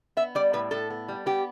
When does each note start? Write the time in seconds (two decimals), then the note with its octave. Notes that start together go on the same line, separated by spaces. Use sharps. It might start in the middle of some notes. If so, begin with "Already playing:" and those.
0.17 B3 E5
0.35 G3 D5
0.53 A2 B4
0.71 A2 A4
0.90 B3
1.08 G3
1.26 B3 G4